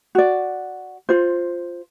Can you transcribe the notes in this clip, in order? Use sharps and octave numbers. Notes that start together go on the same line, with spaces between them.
F#4 D5
F4 C5